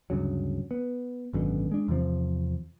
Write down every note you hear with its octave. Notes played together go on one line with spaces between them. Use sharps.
D2 G2 C#3 F#3
B3
G#1 F#2 B2 D3
G#3 D4
E2 C3 F3 C4